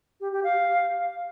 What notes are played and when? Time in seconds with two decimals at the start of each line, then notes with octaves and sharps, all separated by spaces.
0.21 G4
0.32 G4
0.44 F5